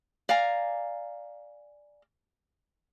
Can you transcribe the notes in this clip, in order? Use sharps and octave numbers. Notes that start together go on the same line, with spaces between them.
D5 F5 G#5 A#5